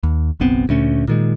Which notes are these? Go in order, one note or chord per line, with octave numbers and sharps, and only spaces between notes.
D#2
F#1 B1 B3 C4
D2 A#2 A3 C#4
A#2 D#3 G#3